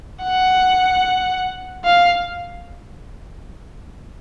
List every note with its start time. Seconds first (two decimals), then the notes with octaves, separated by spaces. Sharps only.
0.24 F#5
1.85 F5